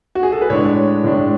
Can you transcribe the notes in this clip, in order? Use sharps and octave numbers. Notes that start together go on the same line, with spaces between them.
F#4
G#4
A4
B4
A2 G#3 D4 C#5
A2 G#3 D4